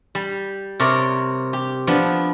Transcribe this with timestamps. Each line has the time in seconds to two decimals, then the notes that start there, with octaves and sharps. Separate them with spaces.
0.15 G3
0.80 C3 A#4 C#5 D5 C6
1.53 G4
1.87 F3 B3 D4